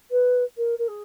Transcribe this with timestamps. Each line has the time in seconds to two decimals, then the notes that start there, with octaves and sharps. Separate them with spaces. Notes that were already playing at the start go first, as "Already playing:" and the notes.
0.11 B4
0.57 A#4
0.78 A#4
0.88 G#4